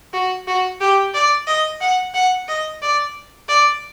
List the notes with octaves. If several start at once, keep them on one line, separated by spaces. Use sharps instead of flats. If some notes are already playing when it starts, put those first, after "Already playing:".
F#4
F#4
G4
D5
D#5
F#5
F#5
D#5
D5
D5